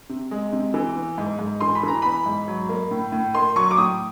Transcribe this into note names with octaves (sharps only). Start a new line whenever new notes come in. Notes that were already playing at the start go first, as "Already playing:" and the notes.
C3
G#3
C3
E3
B3
G#2
G#2
E3 C6
B5
E3 A#5
B3 B5
G#2
F#3
A#3
A2
A2
A#3 C6
F#3 C#6
D6
A2 D#6